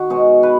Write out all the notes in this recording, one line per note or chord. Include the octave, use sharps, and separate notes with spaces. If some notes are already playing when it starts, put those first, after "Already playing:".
Already playing: D#3 F#4
B2 G#3 D#4 C#5
B4